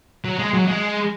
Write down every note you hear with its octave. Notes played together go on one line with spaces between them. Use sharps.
F#3
G#3
F#3
G#3